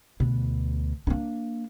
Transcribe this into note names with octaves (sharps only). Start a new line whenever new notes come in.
D2 B2
A#3 D4